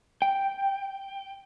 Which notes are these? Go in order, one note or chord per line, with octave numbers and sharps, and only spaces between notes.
G5